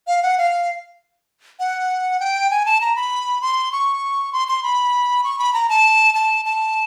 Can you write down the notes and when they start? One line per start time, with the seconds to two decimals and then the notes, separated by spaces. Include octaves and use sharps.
0.07 F5
0.23 F#5
0.38 F5
1.60 F#5
2.20 G5
2.51 G#5
2.66 A5
2.81 A#5
2.96 B5
3.42 C6
3.72 C#6
4.33 C6
4.48 C6
4.63 B5
5.24 C#6
5.39 B5
5.54 A#5
5.69 A5
6.15 A5
6.45 A5